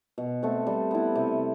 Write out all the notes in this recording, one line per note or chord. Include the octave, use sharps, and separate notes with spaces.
B2
A3 C4 F#4
G3
B3 E4
C3